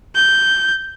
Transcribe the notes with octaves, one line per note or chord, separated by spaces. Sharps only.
G6